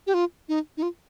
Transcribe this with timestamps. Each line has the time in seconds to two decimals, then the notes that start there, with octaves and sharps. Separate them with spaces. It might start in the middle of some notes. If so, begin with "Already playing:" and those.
0.07 G4
0.14 F4
0.49 D#4
0.77 D#4
0.83 F4